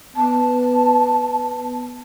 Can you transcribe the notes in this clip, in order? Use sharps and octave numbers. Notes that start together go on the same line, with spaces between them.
B3 A5